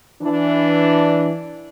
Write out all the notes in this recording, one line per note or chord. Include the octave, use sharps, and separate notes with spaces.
E3 D4